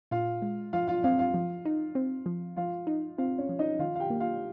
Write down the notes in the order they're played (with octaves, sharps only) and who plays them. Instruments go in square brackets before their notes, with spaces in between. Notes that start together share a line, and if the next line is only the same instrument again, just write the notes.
[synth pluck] A#2 [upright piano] F4 F5
[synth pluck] G#3
[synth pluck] F3 [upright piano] F4 F5
[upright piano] F4 F5
[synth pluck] C4 [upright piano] F4 F5
[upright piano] F4 F5
[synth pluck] F3
D#4
C4
F3
[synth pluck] F3 [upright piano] F4 F5
[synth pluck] D#4
[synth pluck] C4 [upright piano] F4 F5
[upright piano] C#4 C#5
[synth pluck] F3
[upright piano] D#4 D#5
[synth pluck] D#3 [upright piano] F4 F5
[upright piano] F5
G4 G5
[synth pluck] A#3
[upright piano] F4 F5